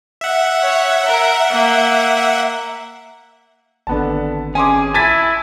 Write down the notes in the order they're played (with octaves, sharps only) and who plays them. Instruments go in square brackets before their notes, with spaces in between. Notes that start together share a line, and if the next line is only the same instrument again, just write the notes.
[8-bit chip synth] E5 F#5
[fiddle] C#5
A#4
A#3
[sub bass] G#1 [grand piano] D3 B3 A5
[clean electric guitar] C#4 [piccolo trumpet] G#4 [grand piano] G#5 C6 D6
[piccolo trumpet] E4 [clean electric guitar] G#5 [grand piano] A5 A6 B6